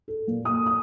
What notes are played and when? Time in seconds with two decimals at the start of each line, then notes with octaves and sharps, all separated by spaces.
0.08 A4
0.27 A#2
0.45 D#6
0.66 D#6